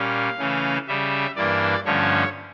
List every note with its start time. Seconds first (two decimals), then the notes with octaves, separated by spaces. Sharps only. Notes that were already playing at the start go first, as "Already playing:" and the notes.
Already playing: A#2 G3 C#4 F5
0.39 C#3 E3 A3 C#4
0.87 C#3 G3 C#4 E5
1.36 G2 E3 A#3 D4 D5
1.85 G2 D3 F3 A3 C#4 C#5